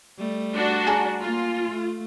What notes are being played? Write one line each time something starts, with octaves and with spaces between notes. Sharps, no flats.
G3 A3
D4 F#4
G#4 A5 A#5
A#3 F4
A3